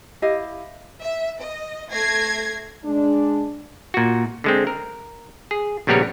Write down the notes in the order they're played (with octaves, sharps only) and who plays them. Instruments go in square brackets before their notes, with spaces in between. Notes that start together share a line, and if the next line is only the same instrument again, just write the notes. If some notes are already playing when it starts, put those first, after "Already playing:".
[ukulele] E4 G4 D#5 F5
[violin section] E5
D#5
A3 G#6 A#6 C7
[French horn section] G#3 D4
[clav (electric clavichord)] A#2 F#4
D3 G#3 C4
A#4
G#4
A#1 C#3 G3 B3 A#4 C#5